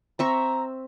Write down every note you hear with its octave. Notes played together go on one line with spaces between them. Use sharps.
C4 E5 A#5 C#6